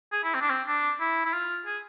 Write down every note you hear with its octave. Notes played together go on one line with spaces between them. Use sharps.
G#4
E4
C4
D4
C4
D4
E4
E4
F4
G#4